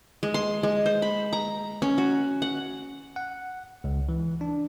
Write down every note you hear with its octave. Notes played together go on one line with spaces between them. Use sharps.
G#3
C6
G#3
C5
B5
A#5
C#4
F#4
F#5
F#5
C#2
E3
D4